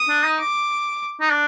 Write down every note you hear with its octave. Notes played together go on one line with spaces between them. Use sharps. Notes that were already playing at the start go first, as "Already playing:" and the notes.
Already playing: D#6
D4
D#4
D6
D#4
D4